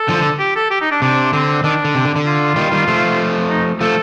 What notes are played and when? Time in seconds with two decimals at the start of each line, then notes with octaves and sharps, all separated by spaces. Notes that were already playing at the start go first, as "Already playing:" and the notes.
Already playing: A4
0.08 D3 F3
0.19 D3
0.39 G4
0.55 A4
0.71 G4
0.81 D#4
0.91 D4
1.02 C3 D4
1.33 D3 C4
1.64 D#3 D4
1.85 D3
1.95 C3
2.05 D3
2.16 D3
2.26 F4
2.56 D#3 G3
2.72 D#3 G3
2.88 F3 A3
3.50 D#4
3.81 F3 A3 A4